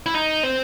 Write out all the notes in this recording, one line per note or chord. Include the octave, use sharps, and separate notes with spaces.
E4
D#4
C4